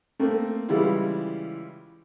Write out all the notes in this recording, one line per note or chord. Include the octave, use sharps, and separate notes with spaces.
A3 A#3 C4
C#3 E3 G3 G#3 E4 F4